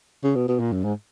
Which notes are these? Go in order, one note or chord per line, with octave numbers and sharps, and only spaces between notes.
C#3
B2
B2
A#2
F#2
G#2